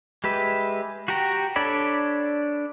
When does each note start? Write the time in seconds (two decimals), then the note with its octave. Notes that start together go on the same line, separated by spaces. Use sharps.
0.24 G#3 G4 B4 E5
1.08 F#4 G4 G5 A#5
1.56 D4 A4 C#5 D5 B5